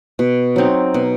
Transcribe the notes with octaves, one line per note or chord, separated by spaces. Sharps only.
B2
F#3 C4 D#4
B2